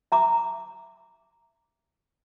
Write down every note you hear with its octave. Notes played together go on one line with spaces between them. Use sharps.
E5 A#5 D6